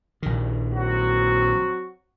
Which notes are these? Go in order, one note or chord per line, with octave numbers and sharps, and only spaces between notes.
A#1 D#3
F#3 C4 F#4